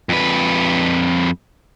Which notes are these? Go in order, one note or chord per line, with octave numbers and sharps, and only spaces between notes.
F2 B4